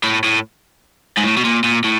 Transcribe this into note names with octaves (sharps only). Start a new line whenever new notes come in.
A2
A2
G#2
A2
B2
A#2
A#2
A2